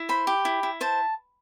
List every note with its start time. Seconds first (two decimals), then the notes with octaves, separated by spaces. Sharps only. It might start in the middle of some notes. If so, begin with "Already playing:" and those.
Already playing: E4
0.09 C5 B5
0.27 G4
0.45 E4
0.63 E4
0.81 C5 A5